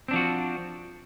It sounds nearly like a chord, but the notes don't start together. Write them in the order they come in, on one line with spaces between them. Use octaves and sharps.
C4 D4 F3 F#4